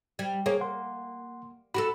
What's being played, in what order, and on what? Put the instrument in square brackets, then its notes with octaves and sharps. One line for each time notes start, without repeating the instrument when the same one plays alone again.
[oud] G3
[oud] A#3 [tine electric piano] G#4 C#5
[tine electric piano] F#5 C6
[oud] F#4 G4 A4 [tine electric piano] B5